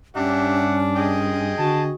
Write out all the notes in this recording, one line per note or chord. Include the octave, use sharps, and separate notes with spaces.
G2 C#4 D4 G4 E5 F#5
G#4 D#5 G5
D3 F#4 A5